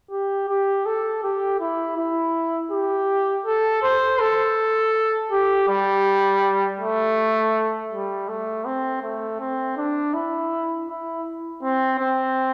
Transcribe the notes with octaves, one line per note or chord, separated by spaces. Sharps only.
G4
G4
A4
G4
E4
E4
G4
A4
C5
A4
G4
G3
A3
G3
A3
C4
A3
C4
D4
E4
E4
C4
C4